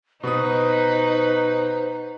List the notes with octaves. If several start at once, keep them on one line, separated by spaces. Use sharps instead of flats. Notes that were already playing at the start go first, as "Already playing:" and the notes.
B2 D#4 B4 C5 D#6